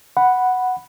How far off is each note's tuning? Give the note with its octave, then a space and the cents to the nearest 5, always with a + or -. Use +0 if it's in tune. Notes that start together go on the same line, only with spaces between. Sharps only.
F#5 +0 B5 +0